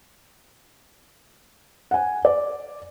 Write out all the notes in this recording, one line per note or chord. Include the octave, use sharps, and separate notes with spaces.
F#5 G#5
D5